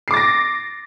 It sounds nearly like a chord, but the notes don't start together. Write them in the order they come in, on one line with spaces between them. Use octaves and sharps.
C7 D6 A6 A#6